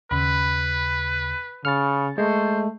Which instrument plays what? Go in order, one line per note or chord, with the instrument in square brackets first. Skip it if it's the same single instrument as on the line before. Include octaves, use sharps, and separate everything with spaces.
[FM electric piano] D#2 C#3 [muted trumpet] B4 [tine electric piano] B5
[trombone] C#3 [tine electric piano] F6 [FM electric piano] A6 C#7
[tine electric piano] G#3 [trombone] A3 [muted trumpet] C5